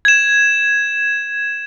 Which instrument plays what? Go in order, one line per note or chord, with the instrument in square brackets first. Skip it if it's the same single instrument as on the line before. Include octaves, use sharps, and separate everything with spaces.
[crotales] G#6 E7